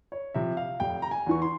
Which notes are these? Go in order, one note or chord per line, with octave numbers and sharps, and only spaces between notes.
C#5
C3 F3 E5
F5
F1 G5
A#5
G#5
E2 E3 C#6
C6